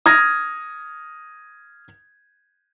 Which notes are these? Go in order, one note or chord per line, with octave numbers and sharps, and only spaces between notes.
D#6 F6 G#6 A#6